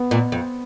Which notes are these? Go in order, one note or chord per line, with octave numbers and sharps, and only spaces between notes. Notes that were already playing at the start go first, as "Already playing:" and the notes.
Already playing: B3 B4
A#2
F2